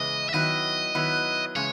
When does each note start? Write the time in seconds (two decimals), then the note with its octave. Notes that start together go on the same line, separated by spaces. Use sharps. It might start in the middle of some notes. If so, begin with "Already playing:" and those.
Already playing: C#3 E3 G#3 B3 D#5
0.29 E5
0.33 D#3 F#3 B3 E4 D#5
0.95 D#3 F#3 B3 E4
1.56 C#3 E3 G#3 C#5